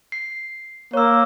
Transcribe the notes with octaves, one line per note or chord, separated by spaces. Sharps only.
C7
A#3 C#5 E6